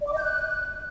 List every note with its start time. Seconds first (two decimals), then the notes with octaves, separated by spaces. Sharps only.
0.01 D5
0.06 D6
0.12 D#5
0.17 G6
0.22 F#6